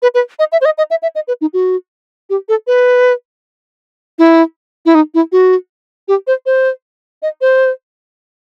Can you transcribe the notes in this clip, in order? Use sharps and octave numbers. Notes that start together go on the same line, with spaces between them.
B4
B4
D#5
E5
C5
D#5
D#5
E5
E5
D#5
B4
D#4
F#4
G4
A4
B4
E4
E4
D#4
E4
F#4
G4
C5
C5
D#5
C5